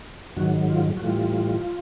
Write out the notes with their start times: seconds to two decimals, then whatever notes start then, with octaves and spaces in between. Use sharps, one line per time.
0.37 G#2 D#3 F#3 F#4
0.70 F4
0.97 F#4
1.02 A2 E3 G3 F4